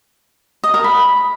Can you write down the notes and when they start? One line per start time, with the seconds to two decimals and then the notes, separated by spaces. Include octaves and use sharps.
0.64 D#5
0.74 A#4
0.84 B5